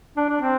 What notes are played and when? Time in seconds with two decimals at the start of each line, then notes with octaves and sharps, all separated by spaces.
0.17 D4
0.29 D4
0.41 C4